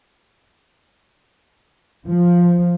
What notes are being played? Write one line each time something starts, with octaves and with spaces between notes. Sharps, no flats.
F3